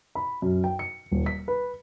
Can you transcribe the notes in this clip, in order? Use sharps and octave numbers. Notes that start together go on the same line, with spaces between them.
B5
F#2
G5
C#7
D#1
B6
B4